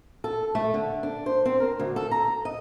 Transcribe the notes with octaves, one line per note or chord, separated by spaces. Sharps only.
A4
A3
D3
D4
C5
C4
A#4
D2
A4
A#5
D#5